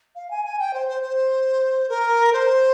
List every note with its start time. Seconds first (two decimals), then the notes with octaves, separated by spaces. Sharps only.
0.15 F5
0.30 G#5
0.45 G#5
0.59 G5
0.73 C5
0.88 C5
1.02 C5
1.89 A#4
2.33 C5